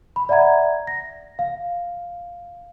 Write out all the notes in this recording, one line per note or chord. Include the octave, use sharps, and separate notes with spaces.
B5
D5 E5 F#5 A#5 G#6
A#6
F5